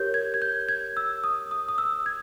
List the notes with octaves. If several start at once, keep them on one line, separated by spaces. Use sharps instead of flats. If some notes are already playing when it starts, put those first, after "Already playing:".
Already playing: G4 A#4 C#5 G6
G#6
G#6
G6
G#6
E6
D#6
D#6
D#6
E6
G#6